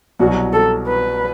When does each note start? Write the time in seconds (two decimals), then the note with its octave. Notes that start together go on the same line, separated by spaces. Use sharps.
0.19 C2 B2 F#3 F#4
0.53 A4
0.88 B4